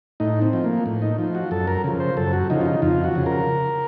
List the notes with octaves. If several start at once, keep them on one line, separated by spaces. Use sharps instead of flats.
A2 D#4
C4
F3
A#3
A2
D#4
F3
F#4
F#2 A4
A#4
C#3 F3
C5
F#2 A4
F#4
C#3 F3 D#4
F4
D#4
F2 F4
F#4
C#3 F3
A#4